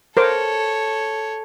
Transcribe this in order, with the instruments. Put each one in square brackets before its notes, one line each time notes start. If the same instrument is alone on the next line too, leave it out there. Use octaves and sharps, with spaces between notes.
[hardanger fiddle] A4 C#5 [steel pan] A#4 C5 D6